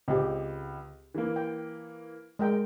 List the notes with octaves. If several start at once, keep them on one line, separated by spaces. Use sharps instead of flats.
C#2 C4 G4
E3 A#3
G5
G#3 A#4 G5